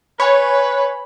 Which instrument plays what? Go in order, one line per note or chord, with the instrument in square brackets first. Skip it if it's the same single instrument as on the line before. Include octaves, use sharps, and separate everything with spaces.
[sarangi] B4 [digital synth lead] C#5 [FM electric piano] G#5 B5